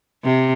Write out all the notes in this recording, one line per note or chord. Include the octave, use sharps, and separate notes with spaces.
C3